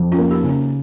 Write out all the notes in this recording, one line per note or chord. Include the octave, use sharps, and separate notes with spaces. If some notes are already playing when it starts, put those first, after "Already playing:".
Already playing: F2
C#4 F4
A#3
D#4 G4
C#3
C#4